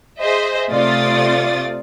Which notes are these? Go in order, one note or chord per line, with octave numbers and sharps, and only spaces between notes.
G#4 C5 D#5 E5
C3 A3 F4 D5 D#6 A6